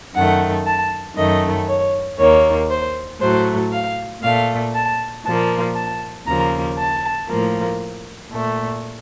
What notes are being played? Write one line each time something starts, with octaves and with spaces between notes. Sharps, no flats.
F#2 D#3 A3 F#5
A5
F#2 D#3 A3 D#5
C#5
D#2 D#3 A#3 C#5
C5
A2 F#3 A3 C5
F5
A#2 A3 F5
A5
A#2 F3 A#3 A5
A5
D#2 C#3 F3 A#3 A#5
A5
A2 F3 A#3
A#2 A3